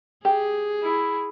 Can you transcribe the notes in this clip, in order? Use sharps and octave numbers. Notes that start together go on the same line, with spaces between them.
G4 G#4
E4